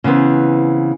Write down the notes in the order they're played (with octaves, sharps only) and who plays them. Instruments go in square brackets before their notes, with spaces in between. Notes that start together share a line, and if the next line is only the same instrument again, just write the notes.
[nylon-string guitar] C#3 E3 B3 C4